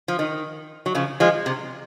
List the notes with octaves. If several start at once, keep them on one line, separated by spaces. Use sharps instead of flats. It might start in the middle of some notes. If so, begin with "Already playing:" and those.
F3
D#3
F#3
C#3 F3
F3 G#3
C3